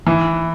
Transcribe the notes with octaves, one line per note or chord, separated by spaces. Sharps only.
E3